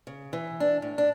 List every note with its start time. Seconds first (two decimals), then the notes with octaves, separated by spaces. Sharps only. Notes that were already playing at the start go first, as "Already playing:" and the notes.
0.07 C#3
0.33 E3
0.60 D4
0.82 A2
0.98 D4